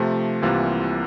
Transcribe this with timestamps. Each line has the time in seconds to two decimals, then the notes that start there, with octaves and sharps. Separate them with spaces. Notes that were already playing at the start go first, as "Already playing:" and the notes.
Already playing: C3 F3 A3
0.42 C2 C3 E3 A#3 F4